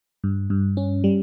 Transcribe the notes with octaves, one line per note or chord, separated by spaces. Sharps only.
G2
G2
C#4
G3